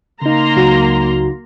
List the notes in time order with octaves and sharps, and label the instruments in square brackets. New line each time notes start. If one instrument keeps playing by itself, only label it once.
[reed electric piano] C#3 D#4 [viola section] A#3 A#5 C6
[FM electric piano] C#2 F#3 F#4